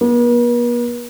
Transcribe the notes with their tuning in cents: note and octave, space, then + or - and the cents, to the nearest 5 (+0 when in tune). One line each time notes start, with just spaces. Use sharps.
B3 -45